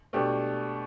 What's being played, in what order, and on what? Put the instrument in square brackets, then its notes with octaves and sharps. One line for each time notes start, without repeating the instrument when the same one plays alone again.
[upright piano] B2 A3 D4 G4